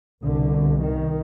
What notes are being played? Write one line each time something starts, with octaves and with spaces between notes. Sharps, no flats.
C2 B2 D3
D#3